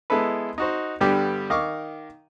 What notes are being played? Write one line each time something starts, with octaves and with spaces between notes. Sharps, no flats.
G#3 B3 E4 A4 B4
D#4 F#4 C5
G2 D3 G3 B3 G4
D#3 D#5 F5 C#6 D6